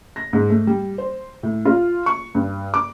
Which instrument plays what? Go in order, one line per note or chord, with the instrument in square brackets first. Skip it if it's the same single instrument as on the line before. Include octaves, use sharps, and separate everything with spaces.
[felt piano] A#6
G#2
A3
G3
C5
A2
F4
C#6
G2
D6